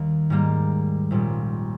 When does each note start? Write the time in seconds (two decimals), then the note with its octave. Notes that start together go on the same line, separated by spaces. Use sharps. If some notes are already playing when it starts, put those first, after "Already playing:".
Already playing: D#2 D#3 G3 A#3
0.30 G#2 G3 A#3
1.11 A#1 A#2 G3 C#4